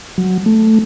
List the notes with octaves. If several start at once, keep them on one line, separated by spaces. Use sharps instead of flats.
F#3
A3